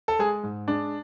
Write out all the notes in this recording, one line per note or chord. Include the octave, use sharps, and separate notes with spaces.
A4
G#3 G#4
G#2
G#3 D4